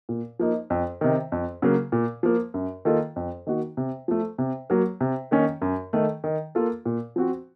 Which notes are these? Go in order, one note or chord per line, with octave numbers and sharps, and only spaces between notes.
A#2
F3 A#3 D#4
F2
C3 D#3
F2
C#3 F#3 A#3
A#2
F3 A#3
F#2
D#3 A#3 F4 A4
F2
D#3 A#3 D#4 F#4
C3
F3 A3
C3
F#3 A#3
C3
D#3 A#3 C#4
F#2
D#3 A3
D#3
A#3 F4 A4
A#2
F3 C4 F#4